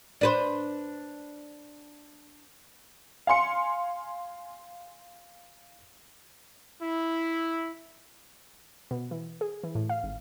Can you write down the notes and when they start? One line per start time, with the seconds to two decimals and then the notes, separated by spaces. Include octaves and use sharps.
0.21 D4 B4 C5
3.27 F5 G#5 C6 C#7
6.80 E4
8.91 B2
9.11 E3
9.41 G#4
9.64 E3
9.75 A2
9.89 F5
10.03 G#1